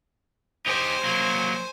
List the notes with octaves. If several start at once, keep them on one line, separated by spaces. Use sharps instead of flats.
D#4 G4 C5 G#5
F#3 A#3